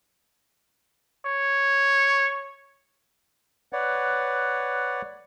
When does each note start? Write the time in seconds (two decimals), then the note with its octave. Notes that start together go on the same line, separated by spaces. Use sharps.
1.25 C#5
3.73 B4 C#5 D5 F#5